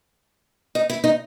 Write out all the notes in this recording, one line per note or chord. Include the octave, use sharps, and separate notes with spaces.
D#4
E4
D#4